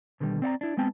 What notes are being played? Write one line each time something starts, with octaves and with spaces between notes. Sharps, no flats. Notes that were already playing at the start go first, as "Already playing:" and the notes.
B2 D3 D#3 F3 G3
C4 D5 F#5 A#5
D4 E4
G#3 B3 C4 G5 A5